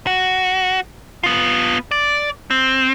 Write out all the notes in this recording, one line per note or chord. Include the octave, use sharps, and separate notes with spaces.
F#4
B3 F4
D5
C4